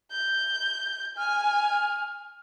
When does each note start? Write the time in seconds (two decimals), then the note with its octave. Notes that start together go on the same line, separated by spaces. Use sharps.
0.11 G6
1.17 G#5 F6